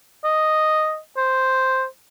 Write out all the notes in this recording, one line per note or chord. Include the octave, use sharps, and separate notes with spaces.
D#5
C5